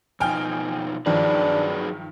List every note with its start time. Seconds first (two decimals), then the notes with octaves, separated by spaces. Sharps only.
0.20 B2 F3 D#4 G5 G#5 F6
1.06 G2 D#3 F3 F#3 D4 G#4 B4